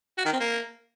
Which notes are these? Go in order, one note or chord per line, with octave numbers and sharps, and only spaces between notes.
F#4
D#3
C4
A#3